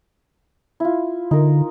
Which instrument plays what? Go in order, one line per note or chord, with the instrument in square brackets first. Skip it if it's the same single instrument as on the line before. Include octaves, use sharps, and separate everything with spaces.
[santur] E4 F4
[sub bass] D3 [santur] D#4 A#4